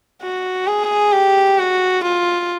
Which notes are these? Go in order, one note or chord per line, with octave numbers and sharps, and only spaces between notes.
F#4
G#4
G4
F#4
F4